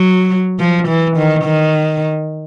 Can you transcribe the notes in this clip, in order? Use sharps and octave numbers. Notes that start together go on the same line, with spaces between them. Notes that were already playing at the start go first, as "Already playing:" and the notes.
Already playing: F#3
F3
E3
D#3
D#3